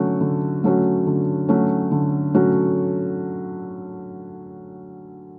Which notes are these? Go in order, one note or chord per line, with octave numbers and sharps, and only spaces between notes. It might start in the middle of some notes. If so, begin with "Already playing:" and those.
Already playing: D3 F#3 A3 C#4 F#4
D3
F#3 A3 C#4 F#4
D3
F#3 A3 C#4 F#4
D3
F#3 A3 C#4 F#4